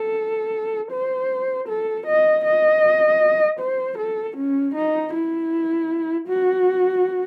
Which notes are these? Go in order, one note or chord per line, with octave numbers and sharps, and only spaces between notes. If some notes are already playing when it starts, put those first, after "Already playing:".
Already playing: A4
C5
A4
D#5
D#5
C5
A4
C#4
D#4
E4
F#4